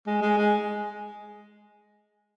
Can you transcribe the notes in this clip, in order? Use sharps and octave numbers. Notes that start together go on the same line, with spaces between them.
G#3
G#3
G#3